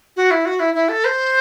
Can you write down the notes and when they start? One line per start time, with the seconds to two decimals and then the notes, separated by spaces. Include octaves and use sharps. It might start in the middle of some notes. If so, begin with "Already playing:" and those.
0.16 F#4
0.31 E4
0.45 F#4
0.60 E4
0.74 E4
0.89 A4
1.05 C5